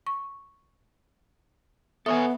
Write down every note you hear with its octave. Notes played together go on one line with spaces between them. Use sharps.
C#6
B3 A4 C#5 E5 G#5 D#6